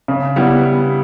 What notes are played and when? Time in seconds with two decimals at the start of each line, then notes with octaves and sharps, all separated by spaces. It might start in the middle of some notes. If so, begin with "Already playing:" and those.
0.08 C#3
0.36 G3 B3 E4